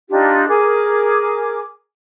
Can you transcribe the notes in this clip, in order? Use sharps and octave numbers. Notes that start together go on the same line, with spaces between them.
D4 D#4 F4 G4
G#4 A#4 D6